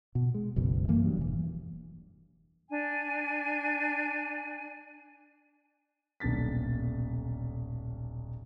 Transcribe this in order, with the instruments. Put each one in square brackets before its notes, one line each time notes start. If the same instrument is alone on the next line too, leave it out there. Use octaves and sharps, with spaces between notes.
[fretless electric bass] B2
G#3
F#1 B1 B2
G2 E3 A3 A#3
G2 F#3
E1 E3
[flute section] D4 G#5
[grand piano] D#1 B1 D4 A6 B6